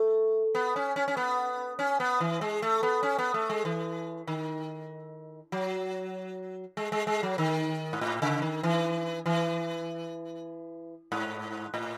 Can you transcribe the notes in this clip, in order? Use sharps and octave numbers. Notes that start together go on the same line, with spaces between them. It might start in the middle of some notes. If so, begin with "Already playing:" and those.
Already playing: A3
B3
C#4
C#4
C#4
B3
C#4
B3
E3
G#3
A3
B3
C#4
B3
A3
G#3
E3
D#3
F#3
G#3
G#3
G#3
F#3
D#3
G#2
A2
C#3
D#3
E3
E3
G#2
A2